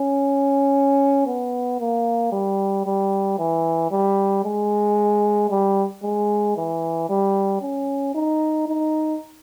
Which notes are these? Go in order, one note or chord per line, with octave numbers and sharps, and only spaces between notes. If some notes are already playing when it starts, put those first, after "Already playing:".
Already playing: C#4
B3
A#3
G3
G3
E3
G3
G#3
G3
G#3
E3
G3
C#4
D#4
D#4